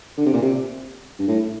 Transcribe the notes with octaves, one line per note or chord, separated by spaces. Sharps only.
D3
C3
A#2
C3
G2
A2